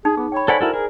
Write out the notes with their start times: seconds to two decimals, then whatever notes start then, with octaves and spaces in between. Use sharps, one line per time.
0.05 D#4 G#4
0.17 B3 G#4
0.32 C#5 G5 B5
0.48 A4 C5 D5 F#5 G#5 B5
0.61 E4 F#4 A4 A#4
0.73 G#4 A#4